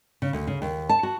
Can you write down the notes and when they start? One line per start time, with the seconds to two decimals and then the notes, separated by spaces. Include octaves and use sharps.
0.22 C#3
0.33 D2
0.47 C#3
0.62 D#2
0.89 A5
1.03 F#4